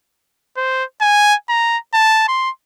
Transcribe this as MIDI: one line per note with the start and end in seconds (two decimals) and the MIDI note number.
0.57 0.84 72
1.01 1.34 80
1.49 1.77 82
1.94 2.24 81
2.28 2.50 84